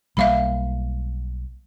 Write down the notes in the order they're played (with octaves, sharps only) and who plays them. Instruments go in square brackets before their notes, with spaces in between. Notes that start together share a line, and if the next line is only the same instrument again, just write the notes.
[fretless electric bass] B1 G3 A#3 [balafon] E5 F5 B5